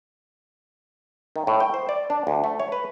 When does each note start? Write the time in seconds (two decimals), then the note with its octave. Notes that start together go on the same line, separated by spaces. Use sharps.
1.36 D#3
1.47 A2
1.60 G5
1.74 C5
1.89 D5
2.10 D4
2.27 D2
2.44 A3
2.60 C#5
2.72 B4